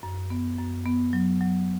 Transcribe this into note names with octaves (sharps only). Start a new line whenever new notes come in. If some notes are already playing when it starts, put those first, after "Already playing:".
F#2
B3
F#2
B3
F#3
F#3